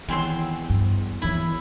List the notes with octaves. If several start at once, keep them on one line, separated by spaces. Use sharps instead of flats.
E2 D#3 C4 C6
G2
D#3 E3 E4